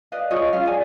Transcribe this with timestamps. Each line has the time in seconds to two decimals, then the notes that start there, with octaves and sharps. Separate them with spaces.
0.12 B4 D5 D#5 F5
0.31 F4 G#4 C#5 D#5
0.53 C#4 F4 F5
0.67 G#4 D5 G#5